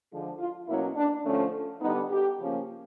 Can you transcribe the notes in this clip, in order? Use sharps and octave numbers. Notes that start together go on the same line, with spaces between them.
D3 F3 G#3
F4
B2 F#3 A#3 C#4 E4
D4
D3 F3 A3 C#4
D3 G3 B3 D#4
G4
C#3 F3 A#3 C#4